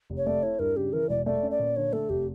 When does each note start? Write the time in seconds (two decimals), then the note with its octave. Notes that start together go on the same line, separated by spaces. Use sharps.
0.10 F1
0.17 C#5
0.26 A3 D5
0.43 E4 C#5
0.59 G2 A#4
0.76 C#3 G4
0.93 E3 A#4
1.09 E1 D5
1.26 A3 D5
1.43 C#4
1.51 D5
1.59 A#2
1.76 D3 C#5
1.93 A3 A4
2.09 F1 G4